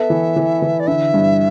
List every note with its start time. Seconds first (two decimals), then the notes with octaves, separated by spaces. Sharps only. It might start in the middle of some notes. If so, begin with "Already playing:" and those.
Already playing: B3 A4 E5
0.10 E3
0.36 E3
0.62 E3
0.80 D5
0.87 D3 E5
1.14 G2